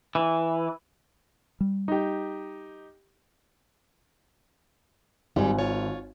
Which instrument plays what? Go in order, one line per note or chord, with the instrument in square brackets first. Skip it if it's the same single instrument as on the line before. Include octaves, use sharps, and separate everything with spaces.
[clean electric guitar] E3
[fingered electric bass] G3
[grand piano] D#4 G4
[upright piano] G#1 G#5 [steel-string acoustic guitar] G3 D#4
[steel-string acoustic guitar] F4 C#5